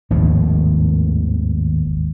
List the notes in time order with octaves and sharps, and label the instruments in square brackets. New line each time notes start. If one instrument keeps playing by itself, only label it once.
[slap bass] G#1 D#2 A2 F3